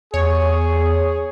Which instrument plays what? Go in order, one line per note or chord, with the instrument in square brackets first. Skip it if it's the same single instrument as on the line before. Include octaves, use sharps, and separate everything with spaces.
[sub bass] E2 [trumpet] G#4 [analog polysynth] C#5